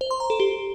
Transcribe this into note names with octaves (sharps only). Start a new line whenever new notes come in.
C5
C6
A#5
A4
G4